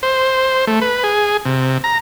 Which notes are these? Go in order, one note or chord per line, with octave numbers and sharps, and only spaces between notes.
C5
A3
B4
G#4
C3
A#5